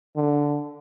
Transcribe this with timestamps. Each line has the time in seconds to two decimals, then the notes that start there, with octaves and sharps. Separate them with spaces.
0.16 D3